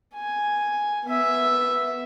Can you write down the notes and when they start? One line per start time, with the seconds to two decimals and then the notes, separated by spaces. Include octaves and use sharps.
0.15 G#5
1.05 B3 E5